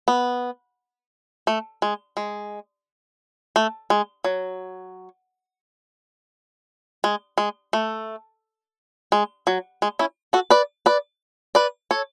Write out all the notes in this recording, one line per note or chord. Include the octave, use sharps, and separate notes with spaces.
B3
A3
G#3
G#3
A3
G#3
F#3
G#3
G#3
A3
G#3
F#3
G#3
C#4 E4
F#4 A4
B4 D5
B4 D5
B4 D5
A4 C#5